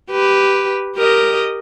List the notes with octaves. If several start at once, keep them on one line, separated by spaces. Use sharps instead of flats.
G4 B4
G4 A#4 D#5